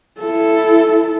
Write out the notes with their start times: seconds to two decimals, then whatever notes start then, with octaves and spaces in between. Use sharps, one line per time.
0.21 E4 A4